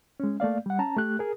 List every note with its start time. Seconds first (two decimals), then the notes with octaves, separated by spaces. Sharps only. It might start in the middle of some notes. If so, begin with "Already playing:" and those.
0.20 G#3 C#4
0.40 A3 A#3 D5 F5
0.66 G3 F#5
0.79 C#4 A5 A#5
0.97 A3 G4 F#6
1.19 G#4 A#4